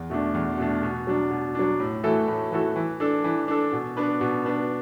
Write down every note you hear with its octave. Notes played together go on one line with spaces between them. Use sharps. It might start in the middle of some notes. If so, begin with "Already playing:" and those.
Already playing: E2
B2 A3 D4
E2
B2 A3 D4
B2
F#3 D4
B2
F#3 D4
A2
E3 A3 F#4 A4
A2
E3 A3 F#4 A4
E3
D4 A4
E3
D4 A4
B2
B3 D4 B4
B2
B3 D4 B4